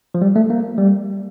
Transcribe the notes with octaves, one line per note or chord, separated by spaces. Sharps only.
F3
G3
A3
A#3
G3